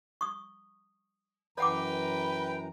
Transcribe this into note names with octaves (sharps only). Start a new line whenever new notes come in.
C#6 D#6
F#2 E3 B4 C#5 F#5 G5 A#5 D6